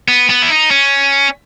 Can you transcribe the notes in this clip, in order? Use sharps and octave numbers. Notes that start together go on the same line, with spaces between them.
B3
B3
E4
D#4
C#4